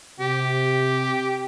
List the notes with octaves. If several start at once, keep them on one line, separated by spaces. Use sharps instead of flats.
C3 G4